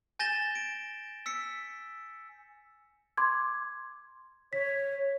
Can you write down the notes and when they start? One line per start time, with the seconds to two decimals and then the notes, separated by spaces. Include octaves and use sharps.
0.19 G#5 G6 A6 A#6 E7 G7
0.55 D7
1.26 E6 B6 C#7
3.17 C6 D6 G#6
4.53 C#5 B6